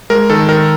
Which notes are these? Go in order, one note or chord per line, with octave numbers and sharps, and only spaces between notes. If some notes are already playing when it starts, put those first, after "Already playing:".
G#3 A#4
D#3 A4
D#3 A#4